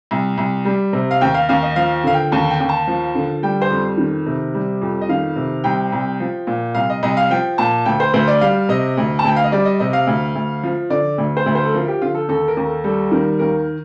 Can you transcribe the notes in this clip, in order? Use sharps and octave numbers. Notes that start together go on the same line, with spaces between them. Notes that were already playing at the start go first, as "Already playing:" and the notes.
C2
C2
G3
C3
F5
D#2 G5
F5
D#2 F5
D#5
F3 F5
D3 F5
G5
D#2 A5
G5
D#2
A5
F3
D3
G3 G5
C5
F2
D#3
C3
G3
F2
D#5
D#3 F5
C3
C2 G5
C2
F3
A#2
C2 F5
D#5
C2 D#5
F5
F3 G5
A#2 A5
D2 G5
C5
D2 C5
D5
G3 F5
C3 D#5
D2
A5
D2 G5
F5
D#5
G3 D5
D#5
C3 D#5
F5
D2
D2
F3
D3 D5
D2
C5
D2
C5
A4
F3 A#4
G4
D3 F4
A4
D#2 A4
A#4
D#2
A4
G3 A4
D#3 A#4
D#2 A#4